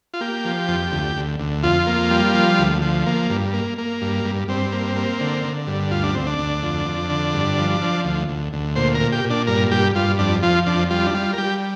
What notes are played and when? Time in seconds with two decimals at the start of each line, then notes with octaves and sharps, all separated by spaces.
0.14 F4
0.21 A#3 G4
0.45 F3
0.68 F2
0.92 D2
1.16 D2
1.40 D2
1.63 F2 F4
1.87 A#3
2.10 G3
2.35 F3
2.59 D2
2.82 F3
3.06 A#3
3.30 G2
3.53 A#3
3.78 A#3
4.02 G2
4.25 G2
4.48 G2 C4
4.73 A#3
4.96 A#3
5.20 D3
5.44 D3
5.67 G2
5.91 D2 F4
6.03 D4
6.15 D2 C4
6.26 D4
6.38 D2
6.63 F2
6.86 F2
7.10 D3
7.34 G2
7.58 F3
7.81 F3
8.05 D2
8.29 D2
8.53 D2
8.76 A#2 C5
8.95 A#4
9.00 A#2
9.12 G4
9.24 A#2
9.30 D4
9.47 G2 A#4
9.71 G2 G4
9.95 G2 F4
10.19 F2 D4
10.43 F3 F4
10.66 F2 D4
10.90 G3 F4
11.06 D4
11.14 G3 F4
11.33 A#4
11.38 G3 G4